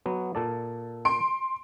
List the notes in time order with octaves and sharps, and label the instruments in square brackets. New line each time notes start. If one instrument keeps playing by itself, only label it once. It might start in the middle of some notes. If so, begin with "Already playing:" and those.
[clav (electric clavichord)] F#3 B3
A#2 A4 D5
[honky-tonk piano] C6 D7